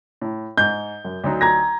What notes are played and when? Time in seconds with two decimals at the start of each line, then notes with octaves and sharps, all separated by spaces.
0.21 A2
0.57 G#2 G6
1.05 F#2
1.24 D2 F#3 D#4
1.41 A#5 G#6 A#6